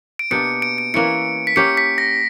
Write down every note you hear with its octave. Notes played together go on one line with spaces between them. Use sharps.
D7
B2 A#3 D4 G4 C#7
D7
D7
E3 A#3 C#4 E4 C#7
B6
A#3 C#4 G4 C#5 C#7
B6
A#6